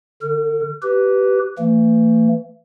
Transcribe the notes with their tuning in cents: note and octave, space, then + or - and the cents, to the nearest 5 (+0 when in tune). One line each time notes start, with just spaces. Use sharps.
D3 +0 A#4 -45
G4 -20 B4 +0
E3 +20 A3 +45